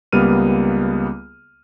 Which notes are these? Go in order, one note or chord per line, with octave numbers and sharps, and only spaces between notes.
C#2 G3 A#3 B3 F6 D#7